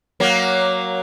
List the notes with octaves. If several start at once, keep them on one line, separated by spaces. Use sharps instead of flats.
F#3 A#3